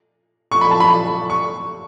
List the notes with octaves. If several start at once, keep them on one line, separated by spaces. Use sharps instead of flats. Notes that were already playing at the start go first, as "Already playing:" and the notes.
C#6
B5
A5
B5
C#6